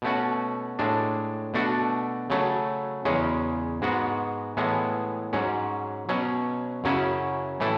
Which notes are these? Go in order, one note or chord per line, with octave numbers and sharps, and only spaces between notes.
B2 A3 C#4 F#4
A2 G#3 D4
B2 A3 D4 F#4
C#3 F#3 A3
E2 C#3 G#3 C#4
G#2 G#3 B3 F#4
A2 E3 G#3 B3
G#2 F#3 C#4
B2 F#3 C#4
F#2 C#3 F#3 C#4 E4
A2 E3 A3 E4